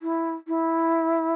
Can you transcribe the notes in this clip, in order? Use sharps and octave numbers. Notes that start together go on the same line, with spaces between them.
E4
E4